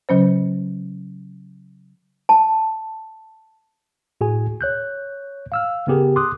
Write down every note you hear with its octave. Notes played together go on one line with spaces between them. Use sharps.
C#3 F#3 C#4 C5
A5
A2 F#4 G#4 G#5
C#5 F#6 G6
F5 E6 F6
C#3 B3 G4 G#4 A#4
C6 D6 D#6 F#6